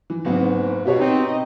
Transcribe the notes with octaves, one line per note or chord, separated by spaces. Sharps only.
E3
F#1 G#2 B3 C4
B2 B3 G4 C#5
C4 D#4
D#5